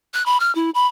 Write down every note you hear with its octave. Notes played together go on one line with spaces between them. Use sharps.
F#6
B5
F6
E4
B5